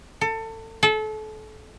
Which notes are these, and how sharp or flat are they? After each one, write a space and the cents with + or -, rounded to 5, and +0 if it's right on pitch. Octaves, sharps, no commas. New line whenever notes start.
A4 +25
A4 -30